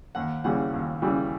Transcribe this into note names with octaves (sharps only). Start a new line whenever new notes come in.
D#2 F#5
C#3 E3 G3 F#5
D#2
C#3 E3 G3